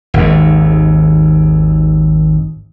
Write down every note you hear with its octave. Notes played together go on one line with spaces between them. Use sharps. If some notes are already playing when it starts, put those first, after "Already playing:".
G#1 D#2